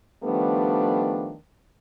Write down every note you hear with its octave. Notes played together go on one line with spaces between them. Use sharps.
D#3 F3 G3 A3 B3 D4